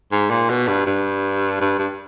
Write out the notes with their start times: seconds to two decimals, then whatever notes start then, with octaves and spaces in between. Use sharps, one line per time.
0.12 G#2
0.30 A#2
0.50 B2
0.68 G2
0.86 G2
1.61 G2
1.79 G2